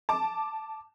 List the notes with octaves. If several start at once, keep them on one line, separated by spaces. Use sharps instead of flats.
A5 D6